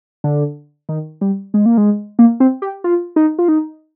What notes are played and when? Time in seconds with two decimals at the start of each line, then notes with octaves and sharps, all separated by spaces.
0.24 D3
0.89 D#3
1.21 G3
1.54 G#3
1.66 A#3
1.78 G#3
2.19 A#3
2.40 C4
2.62 G4
2.84 F4
3.16 D#4
3.39 F4
3.48 D#4